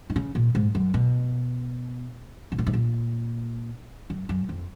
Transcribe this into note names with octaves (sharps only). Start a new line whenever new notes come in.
D#3
C#3
A#2
G#2
F#2
B2
B2
A#2
G#2
A#2
F#2
F#2
F2